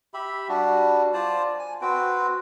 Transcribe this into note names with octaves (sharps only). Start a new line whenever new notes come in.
G4 E5 B5
G3 D4 F#4
F4 C5 D5 A5
G#5
C4 F#4 B4 G5